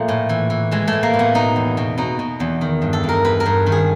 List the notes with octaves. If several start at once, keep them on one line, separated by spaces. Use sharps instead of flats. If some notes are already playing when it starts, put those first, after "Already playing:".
Already playing: A#2 F3 A3
A2
E3
E3
E3 G#3
A3
A2
A#3
A2
B3
B2 D#4
E2
B2
B2 D#4
B2
E2
D#3
G2
A4
G2
A#4
G2 B4
A#4
G2
D#3
G#4